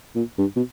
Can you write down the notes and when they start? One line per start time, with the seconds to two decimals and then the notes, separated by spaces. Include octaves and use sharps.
0.15 A#2
0.38 G2
0.56 B2